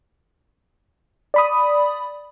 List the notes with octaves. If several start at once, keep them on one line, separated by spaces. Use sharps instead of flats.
D5 B5 D#6